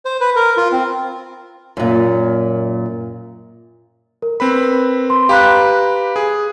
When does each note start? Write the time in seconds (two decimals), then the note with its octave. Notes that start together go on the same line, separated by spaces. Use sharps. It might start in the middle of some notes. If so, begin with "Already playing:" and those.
0.05 C5
0.21 B4
0.36 A#4
0.57 F4
0.72 C4
1.77 F#2 A#2
4.22 A#4
4.40 C4 B4 B5
5.10 C6
5.29 G4 B4 F5 A#5 B5 F#6
6.16 G#4